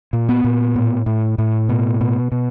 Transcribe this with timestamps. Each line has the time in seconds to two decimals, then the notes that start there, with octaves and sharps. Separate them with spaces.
0.13 A#2
0.29 B3
0.44 A#2
0.76 A2
1.06 A2
1.38 A2
1.69 B2
2.01 B2
2.32 B2